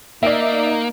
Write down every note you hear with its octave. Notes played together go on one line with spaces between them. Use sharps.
A#3 D#4 D5 E5